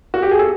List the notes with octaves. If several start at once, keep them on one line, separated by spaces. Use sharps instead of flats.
F#4
G4
G#4
A4